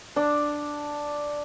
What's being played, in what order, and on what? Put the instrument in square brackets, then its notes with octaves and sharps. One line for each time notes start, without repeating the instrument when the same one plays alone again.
[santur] D4